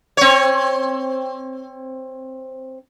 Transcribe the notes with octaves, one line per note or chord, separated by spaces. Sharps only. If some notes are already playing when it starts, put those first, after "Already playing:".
C4 C#5